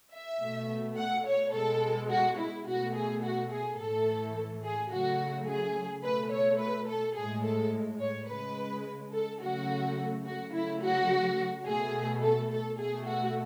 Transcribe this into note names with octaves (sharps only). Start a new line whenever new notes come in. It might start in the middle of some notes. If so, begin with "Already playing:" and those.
E5
B2 A3
F#5
C#5
B2 G#3 A4
F#4
E4
B2 A3 F#4
G#4
F#4
G#4
A2 E3 A3 A4
G#4
C#3 F#3 A3 F#4
G#4
B2 A3 B4
C#5
B4
A4
A2 G#3 G#4
A4
C#5
C#3 G#3 B4
A4
C#3 F#3 A3 F#4
F#4
C#3 F#3 A3 E4
F#4
B2 A3 G#4
A4
A4
B2 A3 G#4
F#4